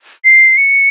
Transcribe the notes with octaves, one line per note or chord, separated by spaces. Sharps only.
C7
C#7